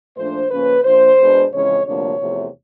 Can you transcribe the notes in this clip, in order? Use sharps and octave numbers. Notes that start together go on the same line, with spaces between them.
A#2 F3 A3 D4 C5
C#3 F3 A#3 C#4 B4
A#2 F3 A#3 D4 C5
B2 G#3 B3 D4
F2 C#3 E3 G#3 C#4 C#5
D2 C3 F3 A#3 D4 C#5
E2 C3 F3 A3